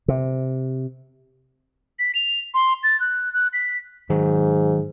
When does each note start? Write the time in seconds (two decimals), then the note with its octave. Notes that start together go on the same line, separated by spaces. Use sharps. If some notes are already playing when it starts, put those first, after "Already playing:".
0.08 C3
1.99 B6
2.15 F7
2.54 C6
2.83 A6
3.00 F#6
3.33 F#6
3.53 B6
4.10 G#2 D#3 F#3